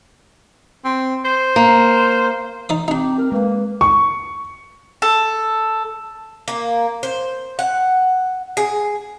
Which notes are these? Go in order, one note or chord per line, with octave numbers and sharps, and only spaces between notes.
C4
C5
A#3
D#4 D5 D#6
C4 D4 D#4 G4
A#4
G#3 A#3 B4
C#6
A4
A#3
C5
F#5
G#4